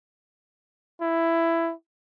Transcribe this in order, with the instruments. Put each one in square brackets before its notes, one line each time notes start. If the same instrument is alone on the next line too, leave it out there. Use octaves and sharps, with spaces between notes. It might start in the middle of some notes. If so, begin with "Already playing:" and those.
[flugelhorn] E4